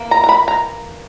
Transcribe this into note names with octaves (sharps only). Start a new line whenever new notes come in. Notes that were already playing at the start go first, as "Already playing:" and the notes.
Already playing: E3 A#3
A#5
A#5
B5
A#5